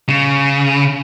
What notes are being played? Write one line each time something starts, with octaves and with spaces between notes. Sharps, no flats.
C#3